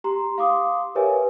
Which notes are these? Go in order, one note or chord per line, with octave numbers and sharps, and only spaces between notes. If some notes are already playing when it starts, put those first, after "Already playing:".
G4 A#5 C6
F5 C6 D6 D#6
G4 A#4 B4 C#5 E5 G#5